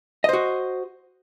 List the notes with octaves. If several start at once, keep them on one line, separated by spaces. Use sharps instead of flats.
F#4 C5 D#5